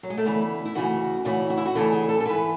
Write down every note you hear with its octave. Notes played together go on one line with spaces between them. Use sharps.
F#3
G#3
A3
D2 C#3 E3 B3
E4
D2 C#3 E3 F#4
D2 C#3 E3 F#4
F#4
E4
F#4
D2 C#3 E3 A4
G#4
A4
A4
G#2 E3 B4